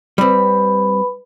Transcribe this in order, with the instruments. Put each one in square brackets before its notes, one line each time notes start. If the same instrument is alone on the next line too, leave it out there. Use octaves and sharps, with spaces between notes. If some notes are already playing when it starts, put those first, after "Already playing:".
[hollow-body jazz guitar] G3 C4 [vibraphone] B4 B5